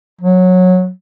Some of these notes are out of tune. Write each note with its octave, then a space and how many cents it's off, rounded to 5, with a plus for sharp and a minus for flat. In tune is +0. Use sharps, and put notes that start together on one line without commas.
F#3 -15